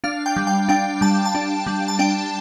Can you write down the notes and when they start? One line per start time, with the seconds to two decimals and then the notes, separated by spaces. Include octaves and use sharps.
0.04 D4 F5
0.26 G5
0.36 G3
0.47 G5
0.69 D4 G5
1.01 G3 A5
1.25 A5
1.35 D4
1.66 G3
1.88 A5
1.99 D4 G5